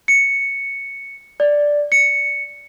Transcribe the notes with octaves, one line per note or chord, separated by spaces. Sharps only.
C#7
D5
C#7